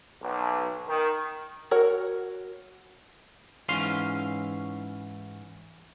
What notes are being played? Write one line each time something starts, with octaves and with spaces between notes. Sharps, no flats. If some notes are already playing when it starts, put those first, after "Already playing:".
B1
D#3
F#4 A#4 C#5
G#2 E3 C#4 F5 C6